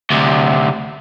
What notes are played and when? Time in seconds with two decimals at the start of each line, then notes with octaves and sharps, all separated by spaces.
0.11 D2 C3